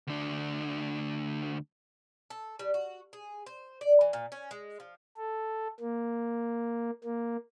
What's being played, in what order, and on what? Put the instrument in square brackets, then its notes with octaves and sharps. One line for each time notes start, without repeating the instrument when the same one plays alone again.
[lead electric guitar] D2 D4
[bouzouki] A4
G3
F#4
G#4
C5
D5
E3
A#2
C#4
G#3
F3
[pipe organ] A4
A#3
A#3